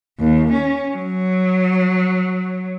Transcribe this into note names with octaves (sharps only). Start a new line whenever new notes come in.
D#2
C#4
F#3